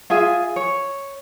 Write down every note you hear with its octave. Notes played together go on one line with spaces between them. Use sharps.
F4 G#4 E5 G#5
C#5